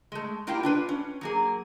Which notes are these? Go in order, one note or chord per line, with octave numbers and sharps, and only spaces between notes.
G#3 A3
A#3 E4 F4 G4 G5
D4 F4 B4
C#4
F#3 A#3 G#4